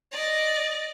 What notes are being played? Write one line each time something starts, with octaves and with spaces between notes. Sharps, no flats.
D5 D#5